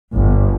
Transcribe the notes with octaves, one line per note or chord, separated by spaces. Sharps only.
G1